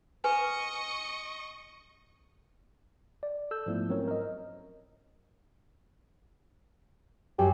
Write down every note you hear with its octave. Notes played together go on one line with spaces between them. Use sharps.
B4 D#5 G#5 C#6
D5
A4 E6 G6
G#2 F3 A3 B3 E4
F#3 C4 C#4 A#4 C5 C#5
A#4 D#5
F#2 G4